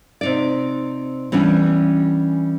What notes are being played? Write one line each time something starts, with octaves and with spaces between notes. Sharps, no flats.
C3 D#4 D5
E3 G3 B3 C#4 D4